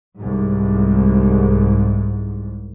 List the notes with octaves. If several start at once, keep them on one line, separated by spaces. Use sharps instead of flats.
C2 G#2